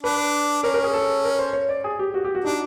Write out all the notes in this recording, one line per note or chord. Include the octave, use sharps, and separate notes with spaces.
D4 B4
C#4 A#4
A#4
G#4
A4
A#4
C5
C#5
D5
G#4
G4
F#4
G4
F#4
D4 D#4